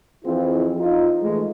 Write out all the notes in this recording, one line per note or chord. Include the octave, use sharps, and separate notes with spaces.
F2 E3 C4 E4 F4 G#4
D#4 F4
E3 G#3 A3